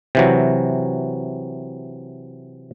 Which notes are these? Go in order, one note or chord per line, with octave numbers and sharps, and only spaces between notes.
C3 E3 F#3